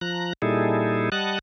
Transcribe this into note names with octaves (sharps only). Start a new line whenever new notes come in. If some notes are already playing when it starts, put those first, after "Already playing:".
F3 A#5 F#6
A#2 G3 D#4 E4 G#4 A4
G3 D#5 F#5 A5 F#6